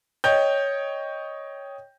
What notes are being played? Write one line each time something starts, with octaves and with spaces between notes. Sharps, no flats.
C#5 D#5 G5 G6